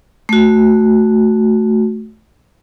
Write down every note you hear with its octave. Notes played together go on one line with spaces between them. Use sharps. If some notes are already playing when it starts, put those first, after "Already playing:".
A3 F#4